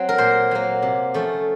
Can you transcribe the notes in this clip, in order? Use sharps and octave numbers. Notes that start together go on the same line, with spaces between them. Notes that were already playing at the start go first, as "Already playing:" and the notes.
Already playing: F#3 C4
A#4
A#2 C5
F#3 A#3
C3
F3 A3 C#4